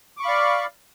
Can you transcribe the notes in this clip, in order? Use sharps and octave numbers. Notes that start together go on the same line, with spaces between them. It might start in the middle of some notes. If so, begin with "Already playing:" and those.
D5 F5 B5 C#6 D6